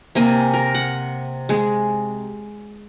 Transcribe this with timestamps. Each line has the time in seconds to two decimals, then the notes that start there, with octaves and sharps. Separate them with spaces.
0.15 C3 A#3 G#5
0.54 A#4
0.74 F#5
1.49 G#3 G#4